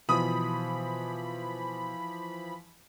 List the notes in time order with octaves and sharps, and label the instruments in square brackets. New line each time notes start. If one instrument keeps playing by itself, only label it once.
[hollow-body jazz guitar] B2 [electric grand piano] E3 F3 [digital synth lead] B5 [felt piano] D#6